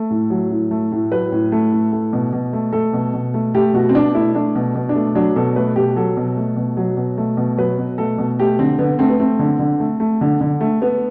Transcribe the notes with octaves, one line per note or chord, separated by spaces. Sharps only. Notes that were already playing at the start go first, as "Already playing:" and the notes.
Already playing: A3
A2
F#3
A2
A3
A2
F#3 B4
A2
A3
A2
A3
B2
B2
A3
A3 A4
B2
B2
A3
A3 G4
B2 F#4
C4
B2 D4
A3 E4
A3 D4
B2
B2
D4
A3
F#3 D4
B2 A4
A3 B4
B2 G4
F#3 A4
B2
A3
B2
F#3
B2
A3
B2
F#3 B4
B2
A3 A4
B2
A3 G4
D3 C4
D3 B3
A3 C4
B3
A3 C4
D3
D3
A3
A3
D3
D3
A3
A3 B3